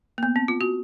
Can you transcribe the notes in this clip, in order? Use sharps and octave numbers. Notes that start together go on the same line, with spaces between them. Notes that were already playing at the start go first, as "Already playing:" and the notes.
A#3
B3
C4
F4
F#4